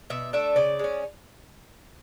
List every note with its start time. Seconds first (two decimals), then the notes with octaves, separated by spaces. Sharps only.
0.10 B2 E5
0.33 A3 D4 E5
0.56 C#3 D5
0.79 G#3 C#4